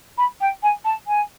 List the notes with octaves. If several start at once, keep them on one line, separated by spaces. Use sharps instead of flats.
B5
G5
G#5
A5
G#5